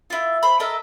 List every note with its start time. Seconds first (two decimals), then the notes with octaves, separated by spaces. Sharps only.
0.10 E4 F4
0.43 C5 B5
0.60 A4 A#4 D#5 E5